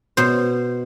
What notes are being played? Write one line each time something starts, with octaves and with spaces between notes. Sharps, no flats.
B2 C5